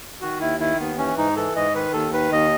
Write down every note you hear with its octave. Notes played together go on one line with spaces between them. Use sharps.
D#3 F#4
D#2 E4
D#3 E4
D#2 B3
E3 C#4
G#2 D#4
E3 A4
G#2 D#5
D#3 B4
D#2 A4
D#3 B4
D#2 D#5